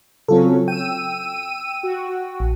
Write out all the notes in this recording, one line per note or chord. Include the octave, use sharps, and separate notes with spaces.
C#3 F#3 C4 C#4 F4 A4
G5 E6 D#7
F#4
A#1